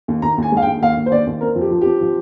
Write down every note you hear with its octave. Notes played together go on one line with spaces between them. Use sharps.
D#2
D#2 A#5
D#2 G#5
G#3 F5
G5
D#2
D#2 F5
D#2
C5
D#2 D5
D#2
C4 A#4
F2
G4
F3
C4 G4
F3